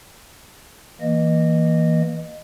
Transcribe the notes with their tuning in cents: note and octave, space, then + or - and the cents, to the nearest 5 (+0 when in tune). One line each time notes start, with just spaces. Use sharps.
E3 -15 A#3 +0 D#5 -20